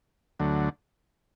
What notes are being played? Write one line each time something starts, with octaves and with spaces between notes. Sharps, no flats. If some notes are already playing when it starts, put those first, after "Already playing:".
D2 D3 F#3 A3